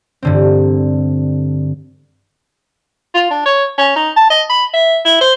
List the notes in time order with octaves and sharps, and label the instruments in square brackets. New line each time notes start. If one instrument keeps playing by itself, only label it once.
[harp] G2 D3 C4
[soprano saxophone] F4
D4
C#5
C#4
D#4
A5
D#5
B5
E5
E4
C5